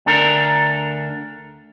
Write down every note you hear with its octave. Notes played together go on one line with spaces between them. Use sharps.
D2 D4 A4 A#4